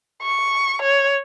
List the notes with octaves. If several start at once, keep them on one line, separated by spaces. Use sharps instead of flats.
C#6
C#5